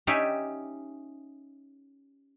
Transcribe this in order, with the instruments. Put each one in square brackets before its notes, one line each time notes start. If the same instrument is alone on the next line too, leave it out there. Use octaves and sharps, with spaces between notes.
[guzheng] C#4 D#4 G4 D5 E5 G#5